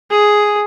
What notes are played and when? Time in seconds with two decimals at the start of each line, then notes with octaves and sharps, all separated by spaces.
0.10 G#4